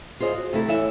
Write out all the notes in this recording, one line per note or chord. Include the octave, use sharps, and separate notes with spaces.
F4 G#4 C5 D#5
F#4
C3 A3 E4 A4
E3 C#5 E5